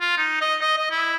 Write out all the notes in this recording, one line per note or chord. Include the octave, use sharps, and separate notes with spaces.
F4
D#4
D#5
D#5
D#5
E4